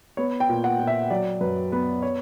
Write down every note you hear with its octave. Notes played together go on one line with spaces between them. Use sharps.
B3 C#5
G5
A#2
F#5
A#2
E5
F#3 D5
F#2 B4
B3 B4
C#5